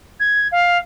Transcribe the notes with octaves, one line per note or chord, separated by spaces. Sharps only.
G#6
F5